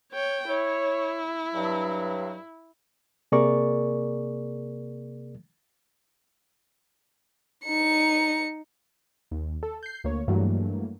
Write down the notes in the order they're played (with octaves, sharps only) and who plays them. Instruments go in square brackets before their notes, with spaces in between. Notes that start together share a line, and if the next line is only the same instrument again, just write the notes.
[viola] C#5 G5
[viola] E4 [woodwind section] C#5
[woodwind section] G2 F#3
[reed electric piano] C3 A#3 G#4 A#4 D5 C#6
[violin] D#4 C#7
[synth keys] D#2
A4
G6 C7
D2 A#3 C#5
G2 E3 F#3 A3 A#3